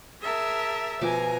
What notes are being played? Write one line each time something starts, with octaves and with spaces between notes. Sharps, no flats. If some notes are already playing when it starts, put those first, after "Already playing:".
G#4 A#4 E5 A5
B2 F3 G#5 A#5 D6